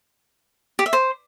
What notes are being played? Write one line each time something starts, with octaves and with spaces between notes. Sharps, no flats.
G4
E5
C5